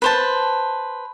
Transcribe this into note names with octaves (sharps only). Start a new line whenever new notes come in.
B4 C5 A5